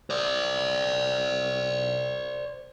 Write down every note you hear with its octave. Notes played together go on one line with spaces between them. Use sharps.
C5 D5